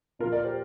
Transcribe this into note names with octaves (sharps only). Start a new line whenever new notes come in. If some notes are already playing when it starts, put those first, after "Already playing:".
A#2 F3 F4 A#4
A#4 D5
G4 C5